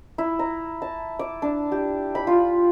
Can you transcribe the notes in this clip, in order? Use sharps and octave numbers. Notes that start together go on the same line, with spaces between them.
E4
A#5
A5
D6
D4
G4
B5
F4